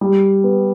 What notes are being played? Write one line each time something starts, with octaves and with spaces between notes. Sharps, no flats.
G3
B3